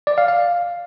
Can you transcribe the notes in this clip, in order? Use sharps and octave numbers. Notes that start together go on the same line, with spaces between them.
D5
F5
F5